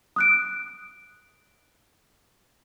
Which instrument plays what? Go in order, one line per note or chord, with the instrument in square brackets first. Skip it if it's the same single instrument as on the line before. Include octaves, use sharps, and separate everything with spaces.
[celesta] D#6 F#6 D7